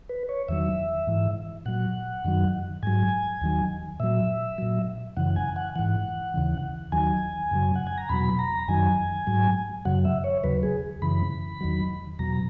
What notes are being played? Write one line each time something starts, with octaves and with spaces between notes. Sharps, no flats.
B4
C#5
E2 D#3 F#3 E5
G#2 E3
A#2 F#3 F#5
F#2 D#3 F#3
G#2 F#3 G#5
D#2 D#3 F#3
A#2 F#3 E5
A#2 F#3
F#2 C#3 E3 F#5
G#5
F#5
G#2 E3 F#5
D#2 C#3 E3
D#2 D#3 F#3 G#5
F#2 C#3 F#3
F#5
G#5
A#5
E2 B2 F#3 B5
A#5
F#2 D#3 F#3 G#5
G#2 F#3
F#2 C#3 F#3 F#5
E5
C#5
D#2 C#3 F#3 B4
G#4
F#2 C#3 E3 B5
E2 D#3 F#3
E2 B2 F#3 A#5